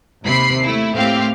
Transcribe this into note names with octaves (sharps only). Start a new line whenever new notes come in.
D#2 C3 B5 C7
A3 E4
A2 A#3 C4 G4 F5